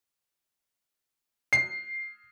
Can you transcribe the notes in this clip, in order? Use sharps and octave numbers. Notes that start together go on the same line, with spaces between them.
C7